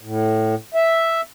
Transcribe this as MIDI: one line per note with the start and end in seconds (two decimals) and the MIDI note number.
0.01 0.55 45
0.74 1.21 76